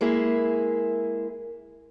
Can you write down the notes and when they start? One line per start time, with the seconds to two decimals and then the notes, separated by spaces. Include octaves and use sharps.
0.01 G#3 A#3 E4 G#4